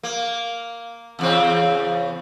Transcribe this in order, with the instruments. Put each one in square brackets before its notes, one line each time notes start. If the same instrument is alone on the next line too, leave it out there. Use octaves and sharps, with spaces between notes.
[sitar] A#3
E2 C#3 C4